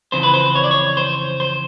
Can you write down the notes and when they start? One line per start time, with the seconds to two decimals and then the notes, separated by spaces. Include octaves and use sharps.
0.12 F2 C#3 E3 C5
0.23 B4
0.34 C5
0.55 C#5
0.64 D5
0.71 C#5
0.97 C5
1.40 C5